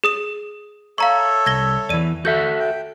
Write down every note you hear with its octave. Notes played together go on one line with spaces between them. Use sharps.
G#4 D#6 E7
A4 C#5 E5 F5 A#5 C#6
C2 G#6 A#6 G7
E2 E3 D5 D#7
F#4 A4 E5 G6
G5